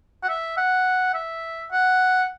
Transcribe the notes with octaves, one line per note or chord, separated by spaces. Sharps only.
F#5
E5
F#5
E5
F#5